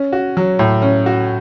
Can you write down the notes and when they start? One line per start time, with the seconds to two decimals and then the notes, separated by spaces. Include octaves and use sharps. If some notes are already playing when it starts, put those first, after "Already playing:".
Already playing: C#4
0.13 F#4
0.37 F#3
0.59 A2
0.82 C#4
1.06 F#4